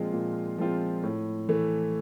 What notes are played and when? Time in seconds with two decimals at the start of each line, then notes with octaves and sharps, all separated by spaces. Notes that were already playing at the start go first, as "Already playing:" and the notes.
Already playing: A#2 F3 G#3 C4 F4
0.13 A#2
0.58 F3 G#3 C4 F4
1.03 A2
1.49 E3 A3